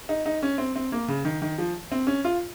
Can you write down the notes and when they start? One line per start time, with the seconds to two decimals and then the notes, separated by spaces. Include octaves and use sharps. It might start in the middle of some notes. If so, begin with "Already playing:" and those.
0.09 D#4
0.26 D#4
0.42 C#4
0.58 C4
0.76 C4
0.92 A#3
1.08 C#3
1.25 D#3
1.42 D#3
1.58 F3
1.92 C4
2.07 C#4
2.25 F4